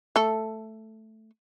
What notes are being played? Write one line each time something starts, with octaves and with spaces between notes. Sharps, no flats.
A3 A4